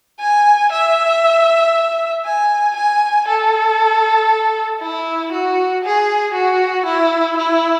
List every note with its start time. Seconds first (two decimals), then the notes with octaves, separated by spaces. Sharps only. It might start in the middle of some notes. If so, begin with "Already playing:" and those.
0.20 G#5
0.71 E5
2.25 G#5
2.76 G#5
3.28 A4
4.81 E4
5.32 F#4
5.84 G#4
6.34 F#4
6.86 E4
7.37 E4